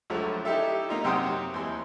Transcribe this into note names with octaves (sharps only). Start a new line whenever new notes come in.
C#2 D3 F3 F#3 A3
D#4 E4 G4 A4 E5
A#3 D#4 F4
F#2 C3 F#5 G5 C6 D#6
D#2 E3 C6